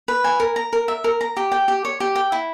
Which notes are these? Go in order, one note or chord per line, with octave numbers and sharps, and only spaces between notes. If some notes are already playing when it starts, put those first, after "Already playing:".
B4
G#5
A#4
A#5
A#4
E5
A#4
A#5
G4
G5
G4
C#5
G4
G5
E4